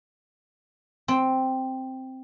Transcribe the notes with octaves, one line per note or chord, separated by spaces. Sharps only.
C4